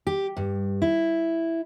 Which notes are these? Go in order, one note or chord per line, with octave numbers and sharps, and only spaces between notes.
G4
G2
E4